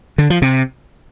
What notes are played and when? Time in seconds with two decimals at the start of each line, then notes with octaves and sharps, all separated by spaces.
0.18 D3
0.30 F3
0.42 C3